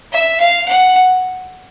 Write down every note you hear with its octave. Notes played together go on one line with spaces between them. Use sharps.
E5
F5
F#5